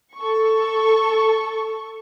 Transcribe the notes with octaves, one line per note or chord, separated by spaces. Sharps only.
A4 C#6